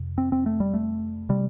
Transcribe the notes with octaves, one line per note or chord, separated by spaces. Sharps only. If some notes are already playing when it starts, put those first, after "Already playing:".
Already playing: F2 C3
C4
C4
A3
G3
A3
C3 G3